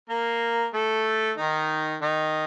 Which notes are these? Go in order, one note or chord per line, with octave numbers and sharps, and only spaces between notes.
A#3 A#4
A3 A4
D#3 D#4
D#3 D#4